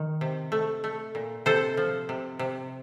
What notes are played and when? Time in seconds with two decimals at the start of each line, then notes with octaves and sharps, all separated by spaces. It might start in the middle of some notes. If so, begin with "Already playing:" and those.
Already playing: D#3
0.21 C3
0.52 A3
0.84 A3
1.15 A#2
1.46 C3 A4 C5
1.77 F3
2.09 C3
2.39 C3